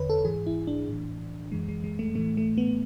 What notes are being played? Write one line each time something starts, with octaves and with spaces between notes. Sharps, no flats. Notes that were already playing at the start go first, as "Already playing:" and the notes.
Already playing: E2 D3 B4 C#5
A4
G#2 E3 G#4
E4
D4
A2 E3
F#2 E3 G#3
G#3
G#3
A3
A2 E3 A3
A3
B3